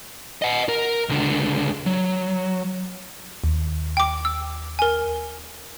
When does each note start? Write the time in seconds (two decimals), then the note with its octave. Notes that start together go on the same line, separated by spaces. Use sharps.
0.42 D#5 F#5
0.69 A#4
1.09 C#2 D3
1.86 F#3
3.44 D#2
3.97 G5 D6
4.25 E6
4.79 A#4 G#5